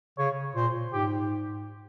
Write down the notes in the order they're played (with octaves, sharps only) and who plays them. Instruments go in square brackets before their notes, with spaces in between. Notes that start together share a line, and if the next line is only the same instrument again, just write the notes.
[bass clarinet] C#3 [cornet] C#5
[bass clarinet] A#2 [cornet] C5
[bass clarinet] G#2 [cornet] G4